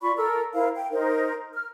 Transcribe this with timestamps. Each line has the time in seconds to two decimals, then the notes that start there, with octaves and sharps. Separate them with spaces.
0.01 F4 D5 B5 C#6
0.17 A4 A#4 E6
0.53 E4 A#4 C5 F5
0.74 G5
0.91 D#4 A#4 C5
1.53 F6